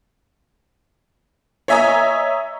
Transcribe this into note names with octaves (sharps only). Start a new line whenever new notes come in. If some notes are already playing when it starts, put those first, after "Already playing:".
C#5 D#5 E5 G#5 A#5 D#6